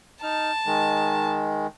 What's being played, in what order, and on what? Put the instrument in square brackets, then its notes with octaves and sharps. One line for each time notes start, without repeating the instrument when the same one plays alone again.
[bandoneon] D#4 F6 [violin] A5
[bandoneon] D#3 G#3